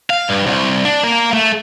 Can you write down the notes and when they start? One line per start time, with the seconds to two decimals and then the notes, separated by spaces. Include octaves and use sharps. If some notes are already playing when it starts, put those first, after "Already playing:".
0.10 F5
0.29 G2
0.47 C2
0.85 D4
1.03 A#3
1.33 A3